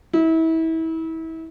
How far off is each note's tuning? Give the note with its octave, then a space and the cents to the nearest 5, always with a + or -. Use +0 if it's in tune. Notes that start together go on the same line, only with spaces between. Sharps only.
E4 -30